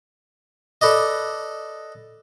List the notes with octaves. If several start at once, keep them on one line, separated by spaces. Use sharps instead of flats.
A4 B4 D5 D#5